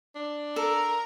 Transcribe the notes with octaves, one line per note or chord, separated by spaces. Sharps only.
D4
A4 A#4